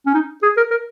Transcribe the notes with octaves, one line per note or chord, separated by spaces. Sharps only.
C#4
D#4
G#4
A#4
A#4